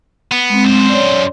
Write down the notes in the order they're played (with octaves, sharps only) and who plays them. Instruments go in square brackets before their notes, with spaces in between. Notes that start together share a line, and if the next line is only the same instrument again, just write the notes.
[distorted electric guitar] B3
[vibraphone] G#3 C4
[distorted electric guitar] F#2 C5
[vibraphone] C#5 D5